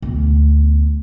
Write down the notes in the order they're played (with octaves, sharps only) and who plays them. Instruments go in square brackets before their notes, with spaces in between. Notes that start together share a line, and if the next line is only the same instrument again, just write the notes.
[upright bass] D2 B3